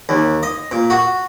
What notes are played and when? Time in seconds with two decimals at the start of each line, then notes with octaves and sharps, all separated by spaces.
0.09 D#2
0.43 D#5
0.71 A#2
0.90 F#4